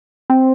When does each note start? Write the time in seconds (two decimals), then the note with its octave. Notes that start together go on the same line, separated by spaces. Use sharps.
0.30 C4